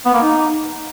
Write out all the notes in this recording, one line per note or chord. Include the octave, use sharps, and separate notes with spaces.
B3
A#3
D#4